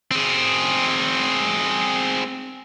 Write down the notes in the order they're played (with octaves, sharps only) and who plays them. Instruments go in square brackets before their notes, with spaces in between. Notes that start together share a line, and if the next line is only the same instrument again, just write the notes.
[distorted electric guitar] C4 G#4